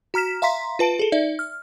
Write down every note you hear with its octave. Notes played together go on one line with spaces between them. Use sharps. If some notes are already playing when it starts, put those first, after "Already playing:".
F#4 A#5 F6 B6 E7
E5 F5 A#5 C6 B6
F4 B4 A5 D7
G#4 A4
D#4 D5 E5
F6